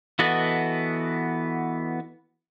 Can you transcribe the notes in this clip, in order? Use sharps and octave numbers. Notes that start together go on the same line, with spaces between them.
E3 B3 F#4 A4 D#5